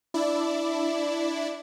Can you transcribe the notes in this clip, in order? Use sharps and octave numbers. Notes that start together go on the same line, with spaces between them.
D4 E4 D5